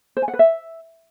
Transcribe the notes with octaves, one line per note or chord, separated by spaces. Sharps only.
C5
G#5
F#5
B4
E5